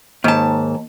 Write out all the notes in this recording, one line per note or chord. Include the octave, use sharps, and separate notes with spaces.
D#2 G#2 A5